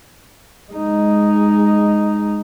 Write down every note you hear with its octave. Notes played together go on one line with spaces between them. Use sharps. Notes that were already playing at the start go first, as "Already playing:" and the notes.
G#3 D#4